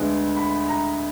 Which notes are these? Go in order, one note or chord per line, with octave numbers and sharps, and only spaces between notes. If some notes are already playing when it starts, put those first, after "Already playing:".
Already playing: D2 D3 G#3 B3
B5
A#5